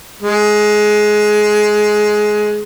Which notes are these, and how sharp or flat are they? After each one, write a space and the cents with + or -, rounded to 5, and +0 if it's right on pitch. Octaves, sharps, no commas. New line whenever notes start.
G#3 +15